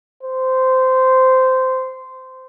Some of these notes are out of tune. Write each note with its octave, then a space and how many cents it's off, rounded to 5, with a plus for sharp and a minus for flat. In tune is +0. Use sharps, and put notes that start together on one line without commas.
C5 -15